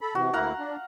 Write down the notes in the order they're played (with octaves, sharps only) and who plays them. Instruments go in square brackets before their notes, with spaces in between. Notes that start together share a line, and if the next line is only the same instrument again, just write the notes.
[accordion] A4 B5
[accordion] C3 E3 [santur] F#4
[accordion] D2 A#3 E4 [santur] F5 F#5 A#5
[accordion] D4